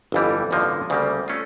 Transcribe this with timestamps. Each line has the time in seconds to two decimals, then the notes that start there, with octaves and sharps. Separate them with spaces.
0.12 G1 F2 E3 G3
0.51 A1 G2 D3 F3 A#3
0.90 D2 C#3 G3 A#3
1.28 A3 C#4 F4